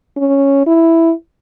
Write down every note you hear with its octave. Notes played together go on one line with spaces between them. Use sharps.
C#4
E4